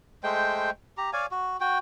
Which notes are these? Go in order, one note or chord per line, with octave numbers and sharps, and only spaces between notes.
G#3 A3 C5 G5
G4 A#5
C#5 D5 F5 G#5
F#4
F#4 G5